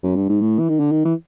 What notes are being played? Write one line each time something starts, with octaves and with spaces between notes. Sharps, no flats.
F#2
G2
G#2
A2
E3
D#3
D3
D#3
E3